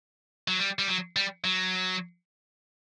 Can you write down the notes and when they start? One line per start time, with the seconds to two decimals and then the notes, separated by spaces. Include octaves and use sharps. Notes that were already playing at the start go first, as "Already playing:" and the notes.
0.48 F#3
0.59 G3
0.79 G3
0.88 F#3
1.16 G3
1.45 F#3